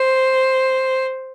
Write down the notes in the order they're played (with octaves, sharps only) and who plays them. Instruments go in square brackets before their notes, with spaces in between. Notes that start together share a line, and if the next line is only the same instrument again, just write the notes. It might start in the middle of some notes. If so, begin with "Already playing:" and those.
Already playing: [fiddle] C5